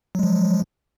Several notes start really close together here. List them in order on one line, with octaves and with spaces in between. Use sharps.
F#3 G#3 F3